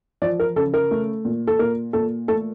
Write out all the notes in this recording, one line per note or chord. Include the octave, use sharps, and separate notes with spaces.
F3 D5
A#4
C#3 A4
A#4
A3
A#2
A4
A#2 A#4
A#2 A4
A3 A4